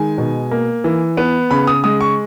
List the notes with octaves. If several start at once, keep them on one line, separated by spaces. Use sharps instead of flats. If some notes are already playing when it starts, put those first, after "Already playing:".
Already playing: D#3 G#3 G#5
B2
A#3
E3
B3
C#3 B5
D#6
G#3 D#6
C#6